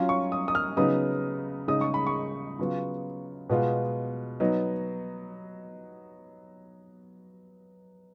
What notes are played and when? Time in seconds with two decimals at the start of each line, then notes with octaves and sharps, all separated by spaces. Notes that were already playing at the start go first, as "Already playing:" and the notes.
Already playing: F#3 C#4 F4
0.09 C#6
0.32 D#6
0.48 D#6
0.55 F6
0.77 C#3 F#3 B3 D#4 D#6
1.68 C#3 G#3 D#4 D#6
1.81 C#6
1.94 B5
2.07 C#6
2.59 C#3 F#3 B3 F4
3.50 B2 G#3 B3 F4
4.40 F#3 B3 D#4